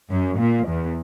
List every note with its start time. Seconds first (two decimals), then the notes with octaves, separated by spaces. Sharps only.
0.10 F#2
0.39 A#2
0.67 E2